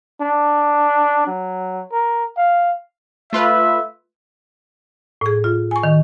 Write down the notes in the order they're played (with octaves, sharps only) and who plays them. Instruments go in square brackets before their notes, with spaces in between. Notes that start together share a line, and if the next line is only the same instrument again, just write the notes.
[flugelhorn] D4
F#3
A#4
F5
[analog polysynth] A3 F4 B4 [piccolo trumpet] E5
[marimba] A2 G#4
F4
G#5 C#6
D#3